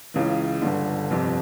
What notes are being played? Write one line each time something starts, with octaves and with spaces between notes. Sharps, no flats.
C#2 C#3 E3
G1 G2 D3
G1 F2 C3